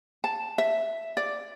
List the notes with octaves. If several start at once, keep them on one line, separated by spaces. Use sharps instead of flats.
A5
E5
D5